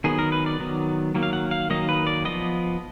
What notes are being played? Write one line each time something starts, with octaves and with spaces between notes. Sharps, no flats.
D#3 F#3 B3 G#4
A#4
B4
D5
D#3 F#3 B3
D#3 F#3 A#3
F5
F#5
F5
D#3 F#3 A#3 D#5
B4
D5
F3 B3 D#5